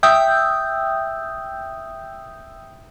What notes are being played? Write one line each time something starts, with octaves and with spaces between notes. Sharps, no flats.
E5 G5 D#6 E6 G6